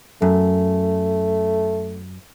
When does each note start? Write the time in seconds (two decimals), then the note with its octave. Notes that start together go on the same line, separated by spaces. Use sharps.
0.22 F#2 A3